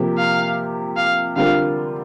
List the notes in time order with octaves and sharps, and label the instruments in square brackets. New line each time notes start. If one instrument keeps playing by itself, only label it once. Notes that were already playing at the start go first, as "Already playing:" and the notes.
Already playing: [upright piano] C3 F3 A#3 G4 A#4
[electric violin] F5
F5
[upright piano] D3 G3 C4 F4 A#4 [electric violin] F5